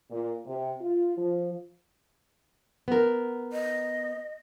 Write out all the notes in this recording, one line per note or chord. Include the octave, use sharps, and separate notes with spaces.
A#2
C3
F4
F3
B3 A#4
D#5